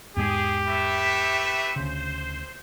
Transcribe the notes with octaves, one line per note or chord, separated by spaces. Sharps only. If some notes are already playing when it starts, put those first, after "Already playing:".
E2 G#2 G#3 G4 G#4
A3 B4 E5
D2 C#3 C5